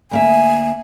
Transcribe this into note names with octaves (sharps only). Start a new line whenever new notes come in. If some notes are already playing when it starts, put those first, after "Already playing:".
D2 A#3 E5 G#5